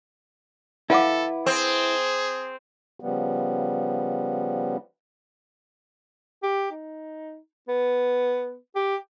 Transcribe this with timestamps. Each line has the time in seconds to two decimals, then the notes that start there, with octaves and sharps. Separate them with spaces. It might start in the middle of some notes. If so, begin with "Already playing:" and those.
0.90 E4 A4 B4 F5 F#5 D6
1.46 C4 G#4
3.00 C#3 F3 G3 B3
6.43 G4
6.71 D#4
7.68 B3
8.75 G4